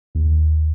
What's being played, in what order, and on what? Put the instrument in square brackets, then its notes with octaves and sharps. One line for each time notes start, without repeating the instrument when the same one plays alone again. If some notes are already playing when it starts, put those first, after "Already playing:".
[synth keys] D#2